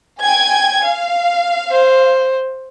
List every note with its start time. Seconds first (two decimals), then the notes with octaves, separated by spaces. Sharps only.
0.22 G5 G#5 G#6
0.85 F5
1.72 C5